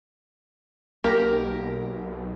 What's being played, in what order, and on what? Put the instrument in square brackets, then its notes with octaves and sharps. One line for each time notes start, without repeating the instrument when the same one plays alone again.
[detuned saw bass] B1 [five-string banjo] A#3 G4 A#4